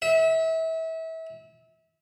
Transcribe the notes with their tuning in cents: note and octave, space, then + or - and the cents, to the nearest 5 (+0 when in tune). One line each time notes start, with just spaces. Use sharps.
E5 -30